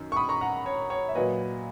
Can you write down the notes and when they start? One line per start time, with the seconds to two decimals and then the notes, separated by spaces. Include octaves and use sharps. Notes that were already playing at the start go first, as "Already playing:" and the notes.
Already playing: F#2 D#3
0.12 C#6
0.16 B5 D#6
0.29 A#5 C#6
0.41 F#5 A#5
0.66 C#5
0.90 C#5
1.09 E5
1.15 A#2 F#3 B4 D#5